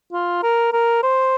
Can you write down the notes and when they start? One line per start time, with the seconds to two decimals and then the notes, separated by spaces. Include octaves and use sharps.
0.13 F4
0.43 A#4
0.73 A#4
1.03 C5